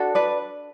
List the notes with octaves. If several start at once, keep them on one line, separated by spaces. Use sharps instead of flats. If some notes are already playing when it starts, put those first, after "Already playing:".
Already playing: D4 F#4 A4
B4 D5